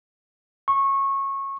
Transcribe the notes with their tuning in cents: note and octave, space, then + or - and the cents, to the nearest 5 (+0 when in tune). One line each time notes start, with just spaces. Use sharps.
C#6 -20